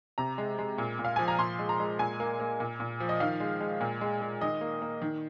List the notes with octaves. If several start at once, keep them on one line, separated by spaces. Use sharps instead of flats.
C3 A#5
G#3
G#3
A#2
A#2
F5
F3 G#5
A#5
A#2 C6
G#3
A#5
G#3
A#2 G#5
A#3
A#3
A#2
A#2
F3
D#5
D#3 F5
G#3
G#3
A#2
G#3
G#3
D#3 D#5
A#3
A#3
D#3